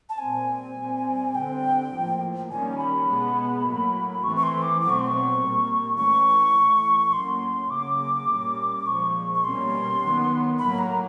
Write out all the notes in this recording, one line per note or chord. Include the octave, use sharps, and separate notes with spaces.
A5
A#2 G3 C4 G#5
A#2 G3 C4
D3 G3 C4 G5
A2 F3 A#3
D#3 G3 A#3 C#4 G#5
B5
B2 G#3 B3
A2 F#3 A#3
E3 A3 C4 C#6
C#6
C6
D6
B2 F#3 A3 C4 D6
C#6
C6
C#6
A#2 G3 A#3
E3 A3 C#4 C#6
A2 E3 A3
A2 F#3 A#3 C#4 C6
C#3 F#3 A#3 C#4 D6
A#2 G3 A#3 C#4
A#2 F3 G#3 C#6
C#6
B2 G3 A#3 C#4 C6
D#3 F#3 B3
A2 F#3 A#3 B5
A#5